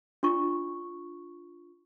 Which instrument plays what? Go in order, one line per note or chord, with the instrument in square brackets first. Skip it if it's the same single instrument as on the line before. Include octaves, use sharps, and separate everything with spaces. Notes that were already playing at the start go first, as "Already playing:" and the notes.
[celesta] D4 F4 C#6